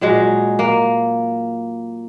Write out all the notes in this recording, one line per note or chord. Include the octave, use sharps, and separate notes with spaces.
A#2 F#3 G#3
A#3